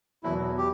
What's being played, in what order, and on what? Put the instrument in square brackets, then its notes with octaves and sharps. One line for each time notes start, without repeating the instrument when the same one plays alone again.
[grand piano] E2 B2 F#3 B3 [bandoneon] E4
[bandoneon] G4